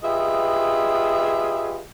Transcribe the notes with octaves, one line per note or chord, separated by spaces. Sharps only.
F4 G4 G#4 B4 D#5 E5